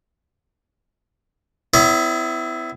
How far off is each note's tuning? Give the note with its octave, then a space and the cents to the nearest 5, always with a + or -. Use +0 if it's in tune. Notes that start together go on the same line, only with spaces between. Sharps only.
B3 +40 E4 +0 C#5 +45